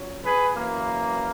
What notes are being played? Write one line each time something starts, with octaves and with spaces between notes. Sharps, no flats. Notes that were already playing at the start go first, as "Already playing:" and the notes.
Already playing: A#2 F#3 C#4
G#4 B4
F#2 E3 A#3